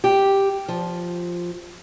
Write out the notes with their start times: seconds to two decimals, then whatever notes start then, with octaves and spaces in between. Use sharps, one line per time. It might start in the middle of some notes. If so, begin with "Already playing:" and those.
0.04 G4
0.68 F3